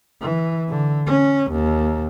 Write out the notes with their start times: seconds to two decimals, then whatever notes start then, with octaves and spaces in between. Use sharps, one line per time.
0.22 E3
0.69 D3
1.06 C#4
1.51 D#2